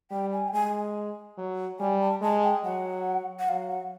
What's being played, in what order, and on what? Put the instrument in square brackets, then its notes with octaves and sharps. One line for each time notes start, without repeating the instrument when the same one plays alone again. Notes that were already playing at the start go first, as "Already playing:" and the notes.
[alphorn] G3 [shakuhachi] G5
[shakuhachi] G#5
G5
[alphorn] G#3 [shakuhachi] G#5
[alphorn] F#3
[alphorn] G3 [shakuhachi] G#5
[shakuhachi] A5
[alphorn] G#3 [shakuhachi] A5
[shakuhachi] G5
[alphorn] F#3 [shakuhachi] F#5
[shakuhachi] F#5
[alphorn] F#3 [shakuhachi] F5
[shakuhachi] F#5